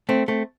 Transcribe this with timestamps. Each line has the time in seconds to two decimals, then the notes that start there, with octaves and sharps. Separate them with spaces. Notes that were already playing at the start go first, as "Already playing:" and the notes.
0.09 A3 C4
0.28 A3 C4